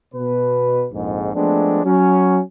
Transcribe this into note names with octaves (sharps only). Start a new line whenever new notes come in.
B2 B4
A#1 F2 G#2
F3 G#3 A3 B3 C4 D4
F#3 C#4